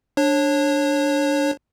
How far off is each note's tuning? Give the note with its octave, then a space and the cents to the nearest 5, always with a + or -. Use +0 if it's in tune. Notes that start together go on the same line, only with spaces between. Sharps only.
D4 +0 C#5 -25